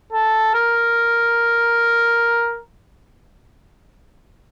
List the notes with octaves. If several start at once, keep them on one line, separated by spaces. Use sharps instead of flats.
A4
A#4